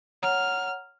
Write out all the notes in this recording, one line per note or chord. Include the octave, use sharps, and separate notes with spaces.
C#5 F#5 A#5 F6